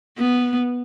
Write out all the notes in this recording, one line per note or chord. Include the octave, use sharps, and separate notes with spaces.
B3